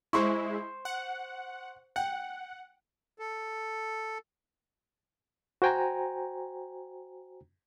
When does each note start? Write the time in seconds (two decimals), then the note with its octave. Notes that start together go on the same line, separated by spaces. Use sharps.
0.13 G#3 E4 C5 C6 C#6
0.85 F#5
1.96 F#5 G5
3.19 A4
5.62 F#4 C5 G5 G#5 A#5